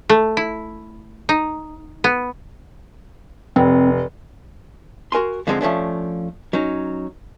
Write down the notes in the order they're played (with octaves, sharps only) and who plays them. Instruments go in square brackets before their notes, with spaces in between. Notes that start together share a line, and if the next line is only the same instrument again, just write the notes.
[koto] A3
E4
D#4
B3
[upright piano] F1 [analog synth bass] C4
[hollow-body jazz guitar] F#4 A#4 G#5 C6
G#2 D3 F3 G#3 A#3 C4
F3 A3 C#4 D4
F#3 C#4 D#4